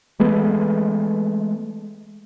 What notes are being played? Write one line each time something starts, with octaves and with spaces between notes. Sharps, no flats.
E3 G#3 A3 B3